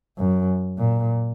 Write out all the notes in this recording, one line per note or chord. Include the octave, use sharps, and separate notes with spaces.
F#2
A#2